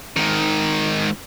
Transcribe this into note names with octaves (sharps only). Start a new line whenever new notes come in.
G#2 D#3